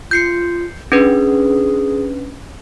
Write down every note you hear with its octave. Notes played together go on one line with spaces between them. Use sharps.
F4 G6 C7 C#7
C#4 D4 G#4 B4